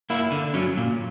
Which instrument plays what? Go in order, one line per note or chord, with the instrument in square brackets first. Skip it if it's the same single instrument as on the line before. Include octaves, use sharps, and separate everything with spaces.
[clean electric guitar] A#3 E4
D3
F#3 C#4
A#2